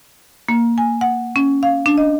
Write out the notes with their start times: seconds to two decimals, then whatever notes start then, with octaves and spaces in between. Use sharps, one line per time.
0.49 A#3
0.78 G#5
1.01 F#5
1.36 C#4
1.63 F5
1.86 D4
1.98 D#5